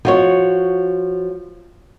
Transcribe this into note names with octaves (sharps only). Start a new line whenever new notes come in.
F3 F#4 C#5